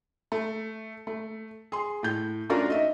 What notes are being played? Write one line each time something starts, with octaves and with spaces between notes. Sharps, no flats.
A3
A3
G#4 C6
A2 G6
A3 C#4 D4 F4 F#4 A#4
D#4 D#5 E5